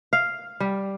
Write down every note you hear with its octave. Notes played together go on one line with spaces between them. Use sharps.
F5
G3